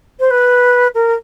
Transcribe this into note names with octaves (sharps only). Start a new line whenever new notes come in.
C5
B4
A#4